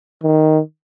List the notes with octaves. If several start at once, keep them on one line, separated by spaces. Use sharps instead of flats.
D#3